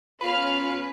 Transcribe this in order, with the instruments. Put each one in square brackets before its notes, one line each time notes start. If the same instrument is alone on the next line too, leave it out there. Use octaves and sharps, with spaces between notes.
[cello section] B3 C#4 [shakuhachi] F4 [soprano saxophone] B4 [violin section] F5 F6